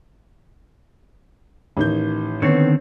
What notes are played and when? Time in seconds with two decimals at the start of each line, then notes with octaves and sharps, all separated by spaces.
1.77 A1 D#3 G6
2.42 D3 D#3 B3 C4 C#5